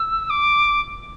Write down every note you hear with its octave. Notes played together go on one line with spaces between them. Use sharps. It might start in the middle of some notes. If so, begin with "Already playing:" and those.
Already playing: E6
D6